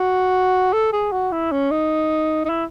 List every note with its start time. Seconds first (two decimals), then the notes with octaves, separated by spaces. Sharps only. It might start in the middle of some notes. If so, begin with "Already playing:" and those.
Already playing: F#4
0.73 A4
0.93 G#4
1.12 F#4
1.32 E4
1.52 C#4
1.71 D#4
2.45 D#4
2.49 E4